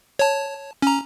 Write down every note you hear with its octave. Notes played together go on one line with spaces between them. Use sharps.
C#5 A5
C#4 A#5